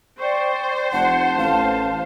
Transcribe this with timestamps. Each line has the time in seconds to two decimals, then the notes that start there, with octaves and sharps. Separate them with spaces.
0.20 C5 D5 G5 C#6
0.93 F1 F#5 A5
1.37 A1 F5